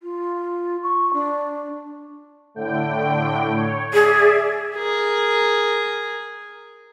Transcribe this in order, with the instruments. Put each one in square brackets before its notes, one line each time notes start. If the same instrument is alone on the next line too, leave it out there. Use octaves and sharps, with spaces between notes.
[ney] F4
C#6
D4
[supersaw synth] A2 D3 G5
C#5
[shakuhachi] G#4 [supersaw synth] D5 E5
[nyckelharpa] G#4 A#4